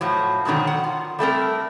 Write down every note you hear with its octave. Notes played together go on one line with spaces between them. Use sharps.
A2 F3 F#3
G#2 B2 D3 D#3 F#3
F#5
F4
G3 A3 C4 A#4